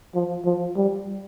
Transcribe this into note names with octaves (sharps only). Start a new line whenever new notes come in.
F3
F3
G3